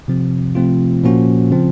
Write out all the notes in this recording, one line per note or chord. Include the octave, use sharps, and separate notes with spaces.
C3 F3 C4
C3 F3 A3 C4 F4
A#2 F3 A#3 C#4 F#4
C#3 F3 C4